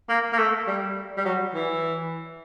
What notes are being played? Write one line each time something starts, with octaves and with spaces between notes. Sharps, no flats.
A#3
A#3
A3
G3
G3
F#3
E3